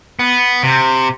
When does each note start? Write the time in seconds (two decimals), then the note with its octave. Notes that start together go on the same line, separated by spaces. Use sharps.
0.19 B3
0.63 C3